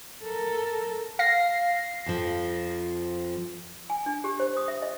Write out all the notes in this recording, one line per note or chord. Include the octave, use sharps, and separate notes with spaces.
A4 A#4
F5 A#6 C7
F2 F3
G#5
D4
G4
C5
D#6
E5
D#5